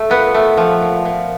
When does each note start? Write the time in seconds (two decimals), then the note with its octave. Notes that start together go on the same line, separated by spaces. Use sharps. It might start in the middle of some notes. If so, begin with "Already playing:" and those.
Already playing: A3
0.10 A#2 B3
0.34 A3
0.57 F3
0.82 A#2
1.05 A#2